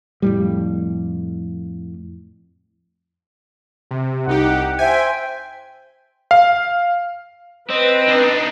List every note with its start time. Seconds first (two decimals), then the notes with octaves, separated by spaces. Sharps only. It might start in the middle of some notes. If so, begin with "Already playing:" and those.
0.22 F2 A2 G3
3.91 C3
4.27 C2 D#4 G4 F#5
4.79 C5 E5 G5 G#5
6.31 F5
7.70 C4 B4 D#5
8.09 D4 D#4